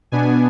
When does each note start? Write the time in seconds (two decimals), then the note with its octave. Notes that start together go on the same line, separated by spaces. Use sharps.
0.12 B2 B3 D4 G#5